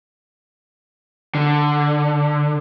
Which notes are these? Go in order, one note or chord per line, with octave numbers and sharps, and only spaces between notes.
D3